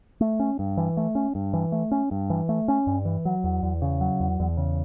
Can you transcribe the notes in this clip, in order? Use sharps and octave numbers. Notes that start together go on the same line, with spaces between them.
A3
C#4
G2
E3
A3
C#4
G2
E3
A3
C#4
G2
E3
A3
C#4
G2
E3
F#3
E2
E2
C#3
F#3
E2
E2
C#3